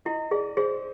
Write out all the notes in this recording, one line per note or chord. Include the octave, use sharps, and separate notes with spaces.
E4 D#5
G#4 D5
G#4 C5